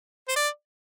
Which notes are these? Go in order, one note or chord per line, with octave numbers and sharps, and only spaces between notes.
C5
D5